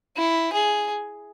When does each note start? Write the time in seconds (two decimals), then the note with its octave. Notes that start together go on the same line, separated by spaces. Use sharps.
0.16 E4
0.52 G#4